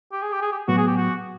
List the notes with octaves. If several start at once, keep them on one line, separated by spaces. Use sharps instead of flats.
G4
G#4
G4
G#4
G4
A2 F#3 B3 F#4
G#4
G4
F#4